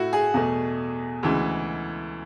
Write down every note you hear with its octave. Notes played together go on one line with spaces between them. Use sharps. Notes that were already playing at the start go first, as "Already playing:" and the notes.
Already playing: A2 A3 E4 F#4
G#4
E2 B2 A3
D2 C#3 E3 G#3